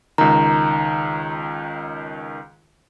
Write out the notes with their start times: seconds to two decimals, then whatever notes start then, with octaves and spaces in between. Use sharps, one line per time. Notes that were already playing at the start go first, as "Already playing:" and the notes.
0.18 C#2 D#3 A#5